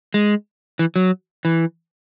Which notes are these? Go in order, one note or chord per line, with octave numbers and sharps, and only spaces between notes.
G#3
E3
F#3
E3